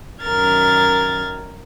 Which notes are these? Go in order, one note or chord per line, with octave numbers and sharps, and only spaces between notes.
F#2 D#3 A#4 F6 G#6 A6